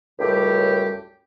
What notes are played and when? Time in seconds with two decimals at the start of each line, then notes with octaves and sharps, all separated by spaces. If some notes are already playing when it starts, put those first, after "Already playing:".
0.19 C#2 F#2 A2 G3 G4